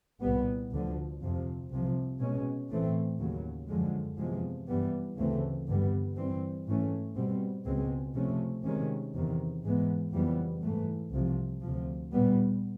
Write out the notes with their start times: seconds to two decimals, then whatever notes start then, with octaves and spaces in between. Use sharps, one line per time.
0.21 C2 A#2 G3 B3
0.71 D2 D3 F3
1.21 F2 C3 F3
1.70 C2 C3 F3
2.20 B2 G#3 C#4
2.70 A2 E3 A3 C4
3.19 D#2 C#3 F#3
3.68 F#2 D3 F3 G#3
4.18 E2 C3 F3 G#3
4.68 G2 E3 G3 B3
5.18 D2 C#3 E3 A3 C4
5.67 G2 D3 G3 B3
6.16 G2 E3 G3 C4
6.66 G#2 E3 A3 C#4
7.15 B2 G3 C4
7.65 C#2 B2 G#3 C4
8.15 C3 F3 A3 C#4
8.64 C3 D#3 G#3 C#4
9.14 E2 C3 D#3
9.64 G#2 E3 G#3 B3
10.13 F2 C#3 E3 G3 B3
10.62 G#2 E3 A3
11.12 C2 C3 F3
11.62 D2 C3 F3
12.12 A#2 G3 B3